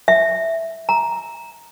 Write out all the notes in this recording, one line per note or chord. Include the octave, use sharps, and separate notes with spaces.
E5
A#5